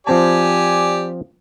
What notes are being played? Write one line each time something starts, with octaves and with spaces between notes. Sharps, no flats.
F3 C4 G4 D5 G#5 A5